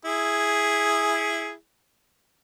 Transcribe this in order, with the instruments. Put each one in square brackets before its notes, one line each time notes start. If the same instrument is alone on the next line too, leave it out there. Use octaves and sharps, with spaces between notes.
[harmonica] E4 G#4